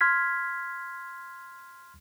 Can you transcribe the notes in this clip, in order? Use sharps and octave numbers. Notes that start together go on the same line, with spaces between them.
C6 F6 G#6 B6